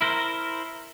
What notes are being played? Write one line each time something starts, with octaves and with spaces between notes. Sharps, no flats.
E4 A#4 C5